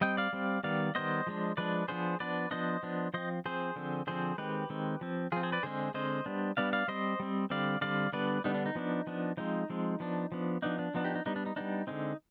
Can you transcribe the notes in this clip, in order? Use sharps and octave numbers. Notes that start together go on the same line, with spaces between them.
G3 C4 D#5 G5
D5 F5
G3 C4
D#3 G3 B3 D5 F5
D#3 G3 B3 C5 D#5
F3 G#3 D4
F3 G#3 D4 B4 D5
F3 B3 D4 G#4 C5
F3 B3 D4 B4 D5
F3 B3 D4 C5 D#5
F3 B3 D4
F3 C4 C5 D#5
F3 C4 G#4 C5
D3 F3 C4
D3 F3 C4 G#4 C5
D#3 G#3 C4 G4 B4
D#3 G#3 C4
F3 C4
F3 C4 F4 G#4
G#4 C5
B4 D5
D3 G#3 C4 G#4 C5
D3 G#3 C4 C5 D#5
G3 B3 D4
G3 B3 D4 D5 F5
D5 F5
G3 C4 C5 D#5
G3 C4
D3 G3 C4 D5 F5
D3 G3 C4 D5 F5
D3 G3 B3 D4 B4 D5
D3 G3 B3 D4 D#4
D4
D#4
F3 B3 D4
F3 B3 D4
F3 G#3 C4 D#4
F3 G#3 C4
F3 B3 D4
F3 B3 D4
F3 B3 D4 D#4
D4
F3 B3 D4 D#4
D#4 G4
D#4
G3 B3 D4 D#4
D4
D#4
G3 B3 D4 D#4
D3 G#3 C4 D#4